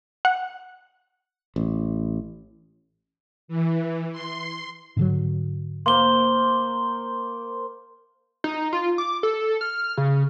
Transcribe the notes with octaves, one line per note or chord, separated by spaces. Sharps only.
F#5
A1
E3
C6
G#2 D3 F#3
A#3 C5 C6 G7
D#4
F4
D6
A4
F6
C#3